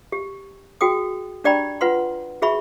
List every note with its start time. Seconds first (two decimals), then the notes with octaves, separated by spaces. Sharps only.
0.12 G4
0.81 F#4 G#4 G5 D#6
1.44 D4 G4 D5 G5 A#5 B5
1.81 F4 B4 F#5 C6
2.42 F#4 G#4 E5 B5 C#6